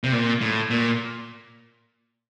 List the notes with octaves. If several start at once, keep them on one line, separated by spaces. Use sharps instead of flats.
C3
A#2
A2
A#2